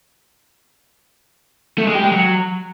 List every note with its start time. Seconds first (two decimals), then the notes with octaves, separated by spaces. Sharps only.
1.78 A3
1.86 G#3
1.95 G4
2.03 G#3
2.12 F#3